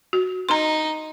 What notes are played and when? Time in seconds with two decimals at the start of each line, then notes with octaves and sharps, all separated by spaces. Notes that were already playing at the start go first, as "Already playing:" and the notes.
0.13 F#4
0.49 D#4 A#5 C6